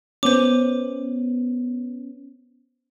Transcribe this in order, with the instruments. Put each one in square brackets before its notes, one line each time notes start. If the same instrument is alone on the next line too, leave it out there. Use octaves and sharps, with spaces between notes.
[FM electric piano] B3 C#4 [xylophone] C5 D6